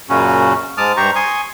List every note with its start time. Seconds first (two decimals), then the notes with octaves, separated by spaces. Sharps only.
0.10 F#2 A#2 C#3 C#4 F#4
0.78 G#2 G#3 A5 D6 D#6 F6
0.97 G2 G4 C5 A#5 C#6
1.16 G#5 C6 C#6 D#6